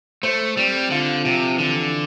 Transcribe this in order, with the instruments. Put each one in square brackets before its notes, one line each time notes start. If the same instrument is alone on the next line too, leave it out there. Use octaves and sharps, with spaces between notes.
[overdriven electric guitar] A3 [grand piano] C5
[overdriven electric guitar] G3 [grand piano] C4
[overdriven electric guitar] D3 [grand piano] F4
[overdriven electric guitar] C3 [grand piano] F3
[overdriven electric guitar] D3 [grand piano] E3